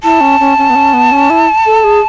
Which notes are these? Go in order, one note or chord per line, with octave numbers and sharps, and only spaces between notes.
E4 A5
C#4
C#4
C#4
B3
C#4
B3
C#4
E4
A4
G#4